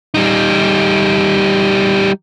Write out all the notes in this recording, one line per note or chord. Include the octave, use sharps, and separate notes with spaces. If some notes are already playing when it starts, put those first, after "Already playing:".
G3 D#4